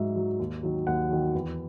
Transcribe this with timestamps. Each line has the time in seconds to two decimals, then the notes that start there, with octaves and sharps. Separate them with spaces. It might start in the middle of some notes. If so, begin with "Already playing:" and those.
Already playing: G#2 F#3 E5
0.16 F#3
0.39 D#2
0.63 D#3 F#3
0.87 D#2 F#5
1.10 D#3 F#3
1.34 E2